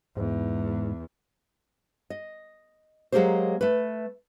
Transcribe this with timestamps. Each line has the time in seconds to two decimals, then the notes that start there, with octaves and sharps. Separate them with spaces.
0.17 E2 G#2
2.10 D#5
3.12 F#3 G#3 A#3 G4 G#4 C5
3.61 A3 B4